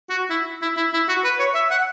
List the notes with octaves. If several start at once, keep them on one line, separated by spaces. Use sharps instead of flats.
F#4
E4
E4
E4
E4
F#4
B4
C#5
E5
F#5